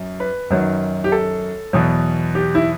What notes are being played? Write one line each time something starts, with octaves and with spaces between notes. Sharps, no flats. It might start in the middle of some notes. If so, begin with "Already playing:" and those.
Already playing: F#2
B4
F#2 D#3 F#3
G4
A4
E2 B2 F#3
G4
E4